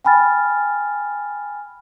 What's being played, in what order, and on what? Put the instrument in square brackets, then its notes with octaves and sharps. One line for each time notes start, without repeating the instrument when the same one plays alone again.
[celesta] G5 G#5 B5 F6 A6